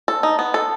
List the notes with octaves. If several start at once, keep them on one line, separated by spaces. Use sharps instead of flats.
A4
D#4
B3
A4